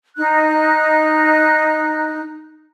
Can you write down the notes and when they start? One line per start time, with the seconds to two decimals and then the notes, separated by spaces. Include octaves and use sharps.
0.16 D#4 F#6